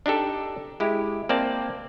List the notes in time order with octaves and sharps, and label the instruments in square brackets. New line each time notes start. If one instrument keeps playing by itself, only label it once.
[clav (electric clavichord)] D4 D#4 G4 A4
G#3 E4 G4
A#3 C4 D5 A5